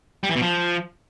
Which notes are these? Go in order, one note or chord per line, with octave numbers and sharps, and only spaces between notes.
G3
E3
B2
F3